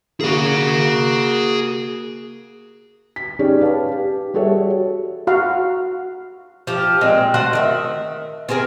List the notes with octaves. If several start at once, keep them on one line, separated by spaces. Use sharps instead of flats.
A#3 F#4 G#4 F5
B6
C#4 D#4 G4 G#4 D5
B4 F5 A5
G4
G3 F#4 G#4 A4 C#5 E5
F#4 F5
F3 G4
A#2 G#3 C4
A3 F#4 C5 F#5
D#3 D5 E5
B3 C4 G#4 A#4